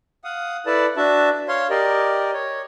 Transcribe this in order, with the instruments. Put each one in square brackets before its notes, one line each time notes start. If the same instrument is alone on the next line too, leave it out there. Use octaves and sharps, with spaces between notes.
[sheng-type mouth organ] F5 F#5 D#6
E4 A4 B4 D5 A5
D4 F#4 E5 A5
C#5 F5 C6
G4 A#4 D5 D#5
C#5